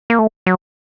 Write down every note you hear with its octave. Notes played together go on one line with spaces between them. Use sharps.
A#3
A3
F#3